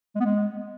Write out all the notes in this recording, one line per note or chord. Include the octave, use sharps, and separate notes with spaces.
G#3
B3
G#3